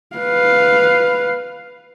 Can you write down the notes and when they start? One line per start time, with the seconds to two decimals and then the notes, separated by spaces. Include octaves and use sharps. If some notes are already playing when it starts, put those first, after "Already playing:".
0.16 B4 F5